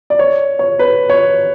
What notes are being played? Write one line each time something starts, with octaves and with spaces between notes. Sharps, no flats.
D5
C#5
C#5
B4
C#5